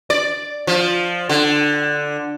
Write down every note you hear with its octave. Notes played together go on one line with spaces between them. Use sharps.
D5
F3
D3